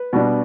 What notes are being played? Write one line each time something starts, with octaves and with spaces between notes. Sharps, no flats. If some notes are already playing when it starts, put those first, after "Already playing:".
Already playing: B4
B2 G3 D4